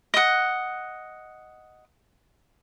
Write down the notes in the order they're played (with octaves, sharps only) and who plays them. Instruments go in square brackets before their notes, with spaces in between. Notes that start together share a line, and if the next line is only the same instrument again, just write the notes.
[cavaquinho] D#5 F#5